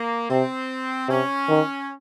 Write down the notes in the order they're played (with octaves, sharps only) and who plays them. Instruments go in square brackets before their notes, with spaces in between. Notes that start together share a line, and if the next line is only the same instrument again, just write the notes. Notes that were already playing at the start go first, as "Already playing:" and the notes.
Already playing: [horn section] A#3
[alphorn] C3 [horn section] C4
[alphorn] C3 [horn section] C#4
[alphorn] D#3